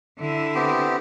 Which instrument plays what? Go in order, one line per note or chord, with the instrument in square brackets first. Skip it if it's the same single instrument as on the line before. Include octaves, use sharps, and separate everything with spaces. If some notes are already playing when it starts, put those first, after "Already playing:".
[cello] D3 E4
[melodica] B3 C4 G4